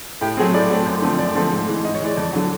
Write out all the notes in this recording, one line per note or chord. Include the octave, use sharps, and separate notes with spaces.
A2 G4
F#3 A3 C4 G#4
A2 D5
F#3 A3 C4
F#2
D3 F3 A3 C4
F#2 D5
D3 F3 A3 C4
G#2
E3 G#3
G#2 D#5
C#5
E3 G#3 D5
F2
D3 F#3